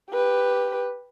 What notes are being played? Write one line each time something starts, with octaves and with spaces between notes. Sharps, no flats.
G4 B4